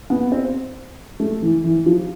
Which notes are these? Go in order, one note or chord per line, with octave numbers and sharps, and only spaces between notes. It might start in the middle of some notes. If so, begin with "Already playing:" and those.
B3
C4
A3
E3
E3
F3